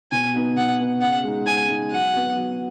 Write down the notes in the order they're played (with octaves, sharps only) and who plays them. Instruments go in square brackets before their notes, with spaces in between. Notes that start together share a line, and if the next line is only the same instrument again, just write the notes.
[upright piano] B2 [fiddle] G#5
[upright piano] B3 D#4 F#4
[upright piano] B2 [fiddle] F#5
[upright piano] B3 D#4 F#4
[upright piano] C#3 [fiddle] F#5
[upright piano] G#3 D#4
[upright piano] C#3 [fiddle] G#5
[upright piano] G#3 D#4
[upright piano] F#3 [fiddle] F#5
[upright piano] B3 F#4
F#3